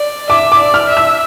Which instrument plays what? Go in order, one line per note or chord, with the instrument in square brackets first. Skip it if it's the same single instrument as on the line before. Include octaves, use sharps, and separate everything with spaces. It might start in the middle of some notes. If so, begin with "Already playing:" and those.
Already playing: [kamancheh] D5
[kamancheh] E5 [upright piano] D6
[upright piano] D6
[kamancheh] D5
[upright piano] F6
[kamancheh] E5
[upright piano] E6